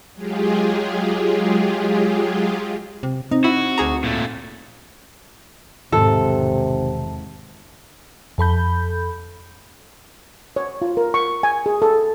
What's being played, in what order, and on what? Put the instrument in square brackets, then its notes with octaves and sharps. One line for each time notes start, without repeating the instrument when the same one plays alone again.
[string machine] F#3 G#3 F4 G4 G#4
[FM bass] C3
[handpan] C4 [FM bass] D#4
[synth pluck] E4 [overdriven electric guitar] F#4
[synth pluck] D2 G#4 A#5
[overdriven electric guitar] A#2 A3
[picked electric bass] E1 D#3 [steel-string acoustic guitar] G#2 [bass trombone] C3 [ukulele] A4
[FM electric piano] F2 A4 B5 G6
[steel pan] C#5
F4
A#4
C#6
G#5
G#4
A4